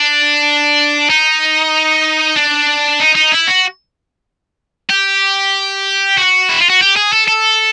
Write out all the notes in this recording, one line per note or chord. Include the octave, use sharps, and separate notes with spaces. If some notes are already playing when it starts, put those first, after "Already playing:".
Already playing: D4
D#4
D4
D#4
D#4
E4
F#4
G4
F#4
E4
F4
F#4
G4
G#4
A4
A4